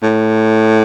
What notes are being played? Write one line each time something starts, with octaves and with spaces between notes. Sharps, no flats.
A2